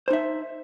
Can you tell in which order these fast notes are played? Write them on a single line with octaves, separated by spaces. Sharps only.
C5 D#4 E5